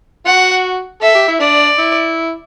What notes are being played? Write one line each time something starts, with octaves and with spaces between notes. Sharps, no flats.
F#4 F#5
A4 E5
G4
E4
D4 D5
E4